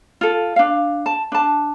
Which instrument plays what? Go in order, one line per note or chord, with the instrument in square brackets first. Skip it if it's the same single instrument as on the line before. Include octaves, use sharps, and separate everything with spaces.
[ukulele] F4 A4
D4 F5
A5
D4 A5